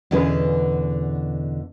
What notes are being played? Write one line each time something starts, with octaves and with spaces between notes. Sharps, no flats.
E2 B2 D3 C#4 G#4 B4